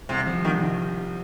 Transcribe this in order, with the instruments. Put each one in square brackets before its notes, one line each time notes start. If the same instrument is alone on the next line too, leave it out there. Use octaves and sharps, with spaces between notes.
[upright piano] C2 [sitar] C3
[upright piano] F3
[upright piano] C2 [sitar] D#3